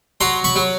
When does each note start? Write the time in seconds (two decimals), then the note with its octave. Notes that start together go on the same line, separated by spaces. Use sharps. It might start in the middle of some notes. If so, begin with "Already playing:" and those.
0.21 F#3 A#5 C6
0.44 B5 C#6
0.56 F#3